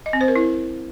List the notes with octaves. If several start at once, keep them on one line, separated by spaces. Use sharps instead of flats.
D#5
C4
C5
A#4
E4